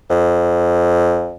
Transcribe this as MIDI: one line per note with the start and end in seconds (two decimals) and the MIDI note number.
0.10 1.37 41